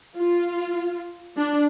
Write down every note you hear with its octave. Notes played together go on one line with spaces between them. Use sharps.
F4
D4